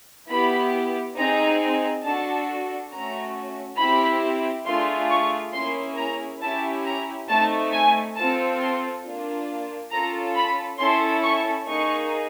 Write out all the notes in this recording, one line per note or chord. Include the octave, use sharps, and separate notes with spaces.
B3 E4 G4 B5
C4 D#4 G#4 A#5
D4 F#4 A4 A5
A3 C#4 F#4 A#5
C4 E4 G4 B5
A3 D4 F4 G#4 C6
C#6
A#3 C#4 E4 G#4 C6
A#5
C#4 E4 G4 A5
A#5
A3 C4 D#4 A5
G#5
C4 F4 A4 A5
C6
A#3 D4 F4
C#4 F4 A4 A#5
B5
C#4 E4 A4 C6
C#6
A#3 D#4 G#4 C#6